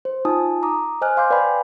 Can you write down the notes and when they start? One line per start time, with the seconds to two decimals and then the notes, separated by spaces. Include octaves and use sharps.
0.05 C5
0.25 D#4 F4 G#5 A5 D#6
0.63 A#5 D6 D#6
1.01 C5 D#5 G#5 F6 F#6
1.17 F5 C6 D6 G6
1.30 B4 D5 F5 G5 G#5 B5